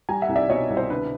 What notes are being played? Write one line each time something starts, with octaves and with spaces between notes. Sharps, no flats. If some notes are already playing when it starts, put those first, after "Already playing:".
G3 G#5 A#5
E5 F#5
C2
D5 E5
B2 C#5 D#5
C2
C5
D3 B4